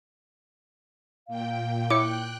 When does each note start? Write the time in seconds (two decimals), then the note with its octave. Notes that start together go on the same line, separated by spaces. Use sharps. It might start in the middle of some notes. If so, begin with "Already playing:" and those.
1.28 A#2 F5 G5
1.90 E4 C#5 G5 D6 F#6 C#7